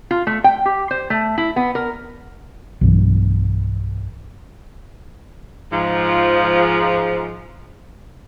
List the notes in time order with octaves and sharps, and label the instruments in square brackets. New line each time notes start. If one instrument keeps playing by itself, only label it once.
[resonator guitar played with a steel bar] F4
A3
G5
G4
C5
A3
E4
B3
A#4
[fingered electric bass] B1 G2 E3
[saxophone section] G#2 F3